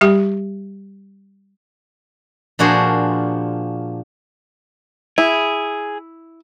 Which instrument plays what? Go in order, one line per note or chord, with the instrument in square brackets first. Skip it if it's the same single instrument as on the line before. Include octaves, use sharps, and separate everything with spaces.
[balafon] G3 G4
[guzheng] A#2 F3 D4 F#4 G#4 C5
[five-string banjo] E4 [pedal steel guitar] G#4